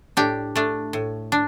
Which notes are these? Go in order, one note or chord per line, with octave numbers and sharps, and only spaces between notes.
A2 D4 G4
A3 D4
A2
D4